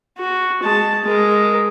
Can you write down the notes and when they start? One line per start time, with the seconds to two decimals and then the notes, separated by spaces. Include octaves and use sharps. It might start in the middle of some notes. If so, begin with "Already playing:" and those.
0.18 F#4
0.63 G#3 A5
1.04 G#3 A#4